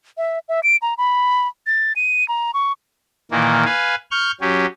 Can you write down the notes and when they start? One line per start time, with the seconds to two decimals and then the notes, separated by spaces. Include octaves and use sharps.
0.17 E5
0.49 E5
0.63 D7
0.82 A#5
0.98 B5
1.67 A6
1.96 D#7
2.28 A#5
2.54 C#6
3.31 A#2 D#3 E3 A#3
3.65 B4 F5 G#5
4.11 C#6 F6 G6
4.41 F#3 C#4 G4